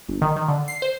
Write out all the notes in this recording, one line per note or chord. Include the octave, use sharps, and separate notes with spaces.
G1
D#3
D#3
D3
C7
C5